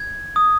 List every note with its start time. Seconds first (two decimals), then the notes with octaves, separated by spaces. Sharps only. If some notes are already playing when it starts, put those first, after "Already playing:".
Already playing: G#6
0.36 D#6